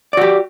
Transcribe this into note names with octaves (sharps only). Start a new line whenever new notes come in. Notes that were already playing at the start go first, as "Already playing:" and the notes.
F#4 G4 D5